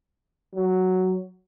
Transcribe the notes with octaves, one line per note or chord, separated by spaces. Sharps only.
F#3